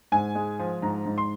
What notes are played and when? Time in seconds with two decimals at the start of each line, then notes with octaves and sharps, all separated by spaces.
0.12 G#2 G#5
0.35 G#3
0.59 F3
0.82 G#2 A#5
1.06 G#2
1.18 C6